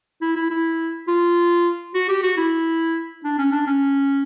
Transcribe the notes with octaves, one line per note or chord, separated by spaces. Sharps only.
E4
E4
E4
F4
F#4
G4
F#4
E4
D4
C#4
D4
C#4